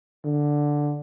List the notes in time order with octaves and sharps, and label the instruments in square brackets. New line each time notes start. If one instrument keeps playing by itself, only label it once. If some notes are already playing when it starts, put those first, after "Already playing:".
[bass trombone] D3